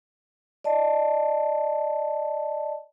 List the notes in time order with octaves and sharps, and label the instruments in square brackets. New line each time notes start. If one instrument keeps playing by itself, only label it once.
[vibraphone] D5 D#5 A5